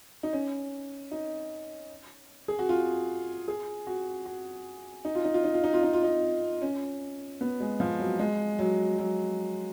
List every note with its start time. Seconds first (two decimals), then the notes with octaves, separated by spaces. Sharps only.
0.23 D#4
0.33 C#4
1.11 D#4
2.48 G#4
2.59 F#4
2.69 F4
3.48 G#4
3.87 F#4
4.25 F#4
5.05 D#4
5.15 F4
5.25 D#4
5.34 F4
5.44 D#4
5.54 F4
5.64 D#4
5.73 F4
5.83 D#4
5.93 F4
6.03 D#4
6.62 C#4
7.41 B3
7.60 G#3
7.80 F3
7.99 F#3
8.19 G#3
8.59 F#3
8.98 F#3